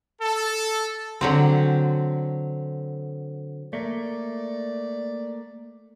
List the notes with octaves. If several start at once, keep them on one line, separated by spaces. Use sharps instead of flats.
A4
D3 F#3 C4
A3 A#3 D5